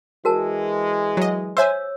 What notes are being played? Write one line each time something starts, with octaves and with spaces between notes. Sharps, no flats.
E3 G#3 F#4 A#4 A5
F#3 D#5
C5 C#5 E5 G#5 E6